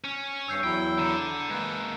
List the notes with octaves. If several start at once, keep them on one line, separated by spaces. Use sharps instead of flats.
C#4
G2 C#5 E6 G6 C7
E2 F#3 E4 G5
D3 A#5
G#3 A#3 B4